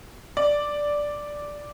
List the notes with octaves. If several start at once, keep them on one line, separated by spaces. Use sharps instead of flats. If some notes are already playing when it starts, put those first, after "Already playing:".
D5